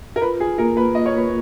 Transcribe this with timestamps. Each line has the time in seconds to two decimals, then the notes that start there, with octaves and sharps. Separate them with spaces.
0.16 A#4
0.21 F4 B4
0.40 G#4
0.58 A#3 A#4
0.77 B4
0.95 A#3 D#5
1.06 C#5
1.17 B4